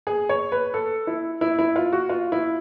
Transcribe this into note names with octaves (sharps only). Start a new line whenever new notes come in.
G#4
C#5
B4
A4
E4
E4
E4
F4
F#4
F4
E4